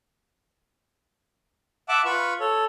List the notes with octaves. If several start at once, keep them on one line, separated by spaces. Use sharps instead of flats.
E5 F#5 A5 D6
F4 B4 B5 C#6
A4 C#5